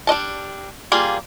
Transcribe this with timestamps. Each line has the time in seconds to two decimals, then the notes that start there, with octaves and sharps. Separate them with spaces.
0.07 G3 D4 D#5 A5
0.92 G3 A#3 F4 G#4